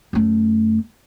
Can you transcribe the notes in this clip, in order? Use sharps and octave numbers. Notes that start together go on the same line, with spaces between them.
F#2 A3